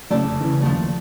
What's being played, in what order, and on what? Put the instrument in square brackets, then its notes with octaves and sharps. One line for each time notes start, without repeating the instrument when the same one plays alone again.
[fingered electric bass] C#3 F#3 [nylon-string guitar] A3 D5 A5
[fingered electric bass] F1 [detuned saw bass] C#3
[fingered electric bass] D#3 E3
[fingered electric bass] F#1 D#2 [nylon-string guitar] F3 A3